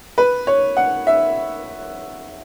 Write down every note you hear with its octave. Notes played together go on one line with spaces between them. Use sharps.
B4
C#5
F#5
E5